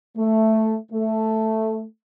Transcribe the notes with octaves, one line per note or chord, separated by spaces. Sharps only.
A3
A3